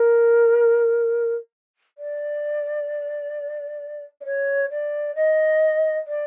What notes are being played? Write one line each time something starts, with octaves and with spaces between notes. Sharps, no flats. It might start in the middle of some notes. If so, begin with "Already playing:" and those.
Already playing: A#4
D5
D5
C#5
D5
D#5
D5